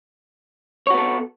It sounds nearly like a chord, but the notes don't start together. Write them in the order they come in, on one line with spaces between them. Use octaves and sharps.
C#5 F#4 B3 A4